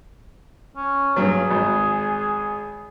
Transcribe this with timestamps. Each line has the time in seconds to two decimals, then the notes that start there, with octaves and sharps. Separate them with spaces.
0.76 C#4
1.16 G2 F#3 G#4
1.50 G#1